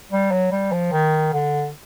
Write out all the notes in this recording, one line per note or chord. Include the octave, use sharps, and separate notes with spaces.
G3
F#3
G3
F3
D#3
D3